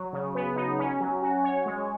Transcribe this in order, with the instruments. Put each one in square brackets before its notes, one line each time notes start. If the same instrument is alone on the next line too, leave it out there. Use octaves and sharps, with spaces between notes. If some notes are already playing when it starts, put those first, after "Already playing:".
Already playing: [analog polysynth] F#3
C#3
B3
D#4
C#4
F#3
F#4
C#5
G#3